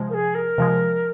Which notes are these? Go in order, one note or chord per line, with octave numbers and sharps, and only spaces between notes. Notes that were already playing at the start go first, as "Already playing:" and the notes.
Already playing: C3 F3 G#3
A#4
G#4
A#4
C3 F3 G#3